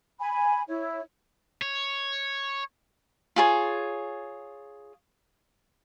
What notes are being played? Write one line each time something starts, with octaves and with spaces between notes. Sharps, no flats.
G#5 B5
E4 C#5
C#5
F4 G#4 C#5